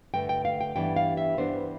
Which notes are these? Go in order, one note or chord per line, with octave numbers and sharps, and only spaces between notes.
G2 D3 A3 G5
G5
F5
G5
G2 E3 G3 B3 D4 G5
F5
E5
G2 E3 G3 B3 D4 C5